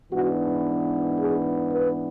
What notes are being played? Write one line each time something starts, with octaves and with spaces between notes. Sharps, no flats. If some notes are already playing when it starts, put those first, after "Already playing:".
G#2 E3 B3 D4 F#4
G#4
B4